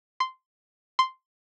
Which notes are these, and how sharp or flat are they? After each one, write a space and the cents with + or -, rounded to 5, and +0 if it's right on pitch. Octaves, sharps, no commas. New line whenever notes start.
C6 -10
C6 -5